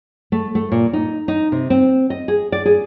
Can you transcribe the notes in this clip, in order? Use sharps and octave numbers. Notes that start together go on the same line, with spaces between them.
A3
A3
A#2
D#4
D#4
C3
C4
D#5
G#4
D5
G#4